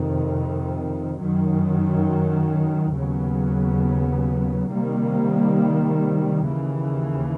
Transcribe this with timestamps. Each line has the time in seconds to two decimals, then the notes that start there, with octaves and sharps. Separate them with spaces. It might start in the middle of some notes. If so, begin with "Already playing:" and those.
Already playing: F2 C3 D#3
1.19 F#2 D#3 F#3
2.94 D#2 C#3 F#3 B3
4.71 C3 D#3 G3 A#3
6.46 D#2 C#3 E3